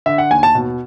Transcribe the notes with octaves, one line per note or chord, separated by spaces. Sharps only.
D3 E5
F#5
D#2 G#5
A5
B2